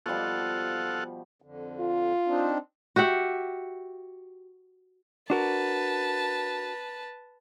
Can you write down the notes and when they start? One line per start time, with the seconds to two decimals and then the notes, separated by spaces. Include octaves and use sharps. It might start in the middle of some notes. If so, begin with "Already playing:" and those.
0.06 B2 F3 G3 F4 A4 F#5
1.42 F2 D3
1.80 F4
2.27 C4 D4 D#4
2.96 F#4 G4 E5 F#5
5.30 D4 F#4 A#4 B4 A5